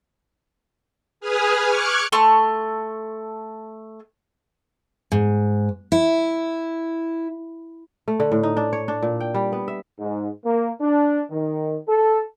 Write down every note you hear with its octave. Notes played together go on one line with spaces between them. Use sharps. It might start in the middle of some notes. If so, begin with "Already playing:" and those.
G#4 B4 G#5 D#6 F6
C#6 D6 F6 F#6 G#6 C#7
A3 A4 C6 C#6
G#2
E4
A3
D3
A2
D#4
D4
C#5
D4
A#2
G5
G3
B3
E5
G#2
A#3
D4
D#3
A4